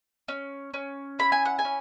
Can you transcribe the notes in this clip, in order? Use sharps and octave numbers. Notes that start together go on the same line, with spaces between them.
C#4
C#4
E4 B5
G#5
F#5
G#5
C#4